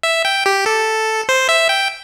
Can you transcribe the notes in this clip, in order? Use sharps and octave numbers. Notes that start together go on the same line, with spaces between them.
E5
G5
G4
A4
C5
E5
G5